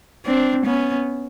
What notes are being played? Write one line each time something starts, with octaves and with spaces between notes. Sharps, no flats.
C4 D4
B3 C#4